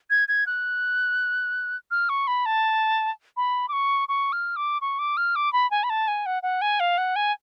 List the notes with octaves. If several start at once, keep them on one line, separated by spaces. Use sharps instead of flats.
G#6
G#6
F#6
F6
C#6
B5
A5
B5
D6
C#6
C#6
F6
D6
C#6
D6
F6
D6
B5
G#5
B5
A5
G#5
F#5
F#5
G#5
F5
F#5
G#5